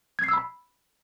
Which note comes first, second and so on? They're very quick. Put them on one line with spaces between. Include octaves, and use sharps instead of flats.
G#6 C7 E6 B5